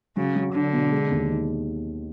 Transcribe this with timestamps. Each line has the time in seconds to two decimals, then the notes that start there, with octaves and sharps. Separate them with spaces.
0.17 C#3 F#3
0.36 F#3
0.54 D3 D4
0.73 B2
0.91 G#3
1.11 D#2
1.29 D#3